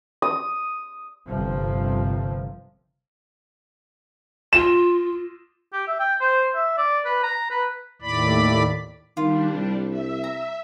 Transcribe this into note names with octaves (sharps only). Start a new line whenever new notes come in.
D#6
G1 C3 F3
F4 E7
G4
E5
G5
C5
E5
D5
B4
A#5
B4
D#2 A2 D5 B5
D#3 G3 D4 F4
C2
E5
A#5